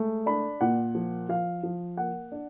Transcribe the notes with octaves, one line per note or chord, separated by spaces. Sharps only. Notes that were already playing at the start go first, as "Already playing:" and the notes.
Already playing: G#3 A3
D4 B5
A#2 F#5
F3
F3 F5
F3
A#3 F#5
D4